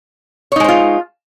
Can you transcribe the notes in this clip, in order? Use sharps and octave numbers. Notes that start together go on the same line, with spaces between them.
G#3 D#4 F4 C5 C#5